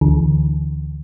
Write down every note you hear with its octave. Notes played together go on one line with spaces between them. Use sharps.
D2 D3 E3